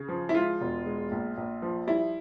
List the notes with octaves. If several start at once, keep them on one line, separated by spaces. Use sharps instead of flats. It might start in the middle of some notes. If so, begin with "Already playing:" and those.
Already playing: C#3
F3
E4
G#3 F4
E1
G#3
A#1
A#1
F3
G3 E4